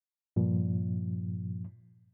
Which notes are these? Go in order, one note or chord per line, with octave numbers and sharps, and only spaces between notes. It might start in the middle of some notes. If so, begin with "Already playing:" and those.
G2 A#2 F3